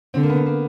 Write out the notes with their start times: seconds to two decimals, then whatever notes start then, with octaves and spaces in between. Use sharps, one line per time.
0.14 D3 C4
0.23 A#3
0.30 B3
0.46 A#3